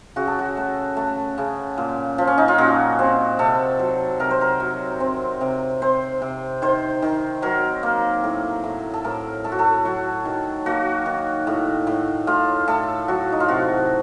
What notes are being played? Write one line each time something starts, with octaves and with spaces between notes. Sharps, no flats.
C#3 F#4
A4
F#4
A3
A3
C#3
A#2
F3
C#4
D#4
F4
A#2 F#4
C4
C3 A4
F#3
C3 A#4
C5
A#4
F#3
C4
C3
C4 C5
C3
D#3 C5
D#3
F#3 A#4
A#3
A2
A2
A4
A2 A#4
A3 A4
F#4
A4
F#3 F#4
D#3
A#3 F#4
D#3
A2
A2
A2 F4
A2 A4
F#3 F#4
D#4
F4
C3 F#4